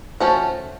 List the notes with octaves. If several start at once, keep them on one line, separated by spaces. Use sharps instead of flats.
F3 A3 C#4 F#4